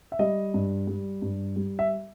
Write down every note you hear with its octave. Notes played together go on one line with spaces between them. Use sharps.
E5
G3 D#5
G2
G3
G2
G3
E5